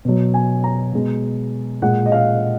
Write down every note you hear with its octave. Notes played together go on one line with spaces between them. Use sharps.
B2 F#3
G#5
A#5
B2 G#3
A#2 G#3 F#5
D#5
F5